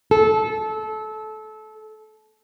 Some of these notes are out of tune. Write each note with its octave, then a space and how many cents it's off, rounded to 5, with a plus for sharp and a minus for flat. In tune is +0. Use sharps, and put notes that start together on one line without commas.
A4 -25